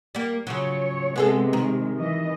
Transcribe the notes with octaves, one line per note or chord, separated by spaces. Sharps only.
G3 A#3
C#3 F3 F#3 C#5
C3 G#3 B3 G#4 A4
D#3
E3 D#5